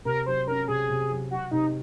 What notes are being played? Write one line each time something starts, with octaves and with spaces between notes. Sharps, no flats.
C3 A#4
F#3 C5
C#4 A#4
C3 G#4
C3
F#3
F#3 F#4
C3 D#4